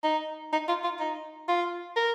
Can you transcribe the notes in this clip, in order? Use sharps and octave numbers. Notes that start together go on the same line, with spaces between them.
D#4
D#4
F4
F4
D#4
F4
A#4